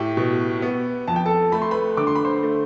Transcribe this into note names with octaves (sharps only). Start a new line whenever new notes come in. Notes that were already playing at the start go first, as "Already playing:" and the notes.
Already playing: A2 G4
B2
B3
F2 A5
G5
A4 A5
A3 B5
C6
B4 B5
D3 D6
C6
B5
C5 C6
A3